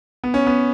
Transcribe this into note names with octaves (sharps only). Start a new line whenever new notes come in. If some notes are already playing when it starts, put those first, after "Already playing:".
B3
C#4
B3